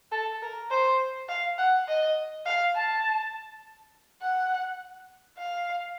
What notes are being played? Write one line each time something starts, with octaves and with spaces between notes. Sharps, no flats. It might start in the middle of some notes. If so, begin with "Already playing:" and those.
A4
A#4
C5
F5
F#5
D#5
F5
A5
F#5
F5